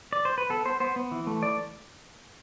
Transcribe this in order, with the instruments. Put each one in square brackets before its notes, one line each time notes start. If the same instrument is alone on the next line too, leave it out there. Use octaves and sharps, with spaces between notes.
[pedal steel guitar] D5
C5
B4
B3 A4
B3 C5
B3 C5
B3
E3
A3
E3 D5